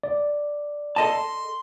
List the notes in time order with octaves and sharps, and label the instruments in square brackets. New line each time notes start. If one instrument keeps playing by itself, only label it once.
[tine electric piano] D5
[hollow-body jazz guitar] A4 D#5 A5 [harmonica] C6